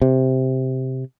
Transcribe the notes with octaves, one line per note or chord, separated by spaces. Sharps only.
C3